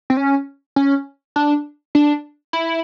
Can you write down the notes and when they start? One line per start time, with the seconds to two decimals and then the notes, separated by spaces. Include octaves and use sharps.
0.10 C4
0.17 C#4
0.76 C#4
1.36 D4
1.95 D4
2.53 E4